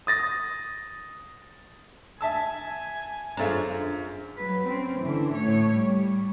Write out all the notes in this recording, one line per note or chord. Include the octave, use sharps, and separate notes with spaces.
D#6 A6 A#6
E5 G#5 A5 E6
F#2 D4 F4 G#4 A4 C5 A#5
F#3 B4
C4 C#4
D3 E3
A2 C#5
G3